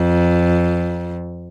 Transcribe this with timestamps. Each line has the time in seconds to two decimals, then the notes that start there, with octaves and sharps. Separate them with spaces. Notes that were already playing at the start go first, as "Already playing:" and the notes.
Already playing: F2